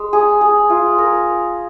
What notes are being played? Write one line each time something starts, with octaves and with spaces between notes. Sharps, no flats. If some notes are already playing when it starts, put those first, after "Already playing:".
Already playing: G#3
G#4
G#4
F4
A#4